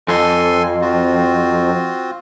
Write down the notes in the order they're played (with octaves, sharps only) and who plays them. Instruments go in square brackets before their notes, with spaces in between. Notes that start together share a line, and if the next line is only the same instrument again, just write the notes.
[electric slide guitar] F2 [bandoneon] A4 G#5 C6
[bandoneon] C4 F4 F#4